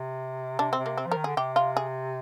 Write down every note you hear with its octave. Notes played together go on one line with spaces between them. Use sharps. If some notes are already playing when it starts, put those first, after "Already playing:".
Already playing: C3
C3 D4
C4
C3
A#3
C4
F3
A#4
D#3
D3 G#4
C3 G4
F4
G#4